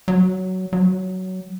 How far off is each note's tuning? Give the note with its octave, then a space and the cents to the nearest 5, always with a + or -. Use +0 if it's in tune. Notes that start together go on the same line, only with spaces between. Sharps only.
F#3 +10
F#3 +10